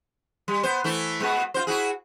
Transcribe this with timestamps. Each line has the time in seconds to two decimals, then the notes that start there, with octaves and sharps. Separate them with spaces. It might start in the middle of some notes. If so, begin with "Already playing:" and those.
0.48 G3
0.63 B3 C5
0.84 E3 A3 E4
1.20 G#3 B3 F#4
1.54 F4 F#4 C5
1.67 E4 F#4 G#4